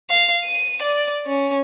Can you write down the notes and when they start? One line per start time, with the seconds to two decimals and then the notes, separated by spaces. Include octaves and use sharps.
0.10 F5
0.45 D#7
0.82 D5
1.26 C#4